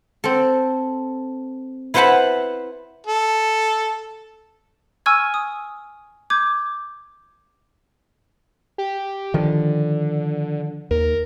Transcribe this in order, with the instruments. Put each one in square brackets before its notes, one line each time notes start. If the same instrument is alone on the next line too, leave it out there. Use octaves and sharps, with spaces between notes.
[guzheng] C4 A4
E4 B4 C5 F#5 A5 B5
[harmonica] A4
[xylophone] G#5 C#6 E6 F6 G#6
D#6
D6 G6 G#6
[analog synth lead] G4
[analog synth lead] D3 [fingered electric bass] D#3 F3
[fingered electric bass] D#2 [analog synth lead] A#4